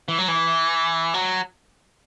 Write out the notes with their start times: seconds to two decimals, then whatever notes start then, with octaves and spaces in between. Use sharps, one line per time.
0.08 E3
0.18 F#3
0.28 E3
1.14 F#3